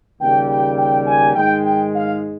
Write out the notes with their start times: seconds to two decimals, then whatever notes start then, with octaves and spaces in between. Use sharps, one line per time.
0.20 D#2 C#3 G3 A#3 G5
0.49 G5
0.78 G5
1.07 G#5
1.35 G#2 D#3 G#3 G5
1.65 G5
1.94 F5